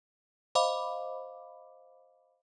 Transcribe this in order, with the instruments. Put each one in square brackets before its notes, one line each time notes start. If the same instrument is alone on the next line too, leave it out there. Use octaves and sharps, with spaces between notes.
[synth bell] C5 D#5 F5 B5 D6